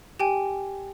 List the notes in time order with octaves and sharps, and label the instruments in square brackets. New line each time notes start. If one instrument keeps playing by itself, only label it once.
[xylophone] G4 G5 G#5